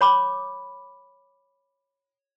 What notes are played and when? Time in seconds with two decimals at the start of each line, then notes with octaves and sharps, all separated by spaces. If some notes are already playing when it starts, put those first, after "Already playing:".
0.01 C#5 B5 D6